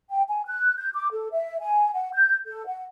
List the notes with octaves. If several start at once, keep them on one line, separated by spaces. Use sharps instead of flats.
G5
G#5
F#6
G6
D6
A4
E5
G#5
F#5
G6
A4
F#5